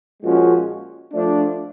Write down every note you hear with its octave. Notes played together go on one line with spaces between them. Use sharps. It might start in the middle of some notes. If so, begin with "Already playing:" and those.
A#2 F3 G#3 C#4 F#4
F3 A3 D4